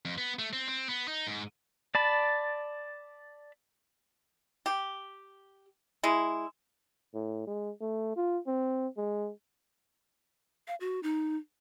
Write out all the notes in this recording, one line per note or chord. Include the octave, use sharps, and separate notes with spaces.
F2
B3
A3
C4
C4
B3
D#4
G#2
D5 A5 B5
G4
G#3 E4
A2
G#3
A3
F4
C4
G#3
F5
F#4
D#4